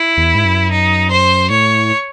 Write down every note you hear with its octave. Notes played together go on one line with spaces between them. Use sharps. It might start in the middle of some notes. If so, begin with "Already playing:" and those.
Already playing: E4
E2
G#2
F#2
D#4
C5
A2 C#5